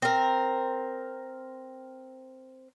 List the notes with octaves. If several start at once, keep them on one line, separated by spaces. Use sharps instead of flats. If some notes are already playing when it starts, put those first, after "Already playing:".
C4 A#4